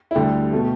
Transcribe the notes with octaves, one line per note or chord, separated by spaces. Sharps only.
E4
D2 D3 G3 G4
B2 A3